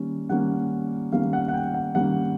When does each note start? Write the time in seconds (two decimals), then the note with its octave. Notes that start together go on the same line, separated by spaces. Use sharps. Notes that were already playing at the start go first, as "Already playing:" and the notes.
Already playing: D#3 G3 A#3 C#4
0.29 D#3 G3 A#3 C#4 F#5
1.12 D#3 G3 A#3 C#4 F5
1.33 F#5
1.48 F#5
1.54 G5
1.74 F#5
1.95 D#3 G3 A#3 C#4 F#5